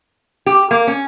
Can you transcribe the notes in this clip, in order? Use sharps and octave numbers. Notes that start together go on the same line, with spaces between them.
G4
A#3
C#4